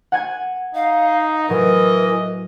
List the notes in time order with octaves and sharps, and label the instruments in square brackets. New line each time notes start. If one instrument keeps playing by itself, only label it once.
[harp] F#5 G#5 G#6
[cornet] D#4 [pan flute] F5
[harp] A2 F#3 [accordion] E3 [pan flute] A#4 [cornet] D#5